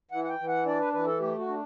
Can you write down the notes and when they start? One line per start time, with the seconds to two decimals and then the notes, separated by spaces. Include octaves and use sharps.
0.11 E3 F#5
0.24 F#5
0.29 G5
0.39 E3
0.48 F#5
0.66 D4 D5
0.80 B4
0.93 E3 B4
1.06 A4
1.20 A3 G4
1.38 F#4
1.48 D4